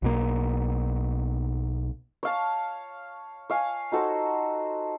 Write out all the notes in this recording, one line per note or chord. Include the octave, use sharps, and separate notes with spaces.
B1 B2 A#3
C#5 F5 A5
C#5 F5 G#5
D#4 F#4 A4 C5